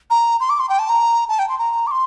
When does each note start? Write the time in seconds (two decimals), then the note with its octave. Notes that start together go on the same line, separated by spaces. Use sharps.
0.10 A#5
0.40 C6
0.49 D6
0.60 C6
0.69 G5
0.79 A5
0.89 A#5
1.29 A5
1.39 G5
1.49 C6
1.59 A#5
1.87 D6
1.91 C6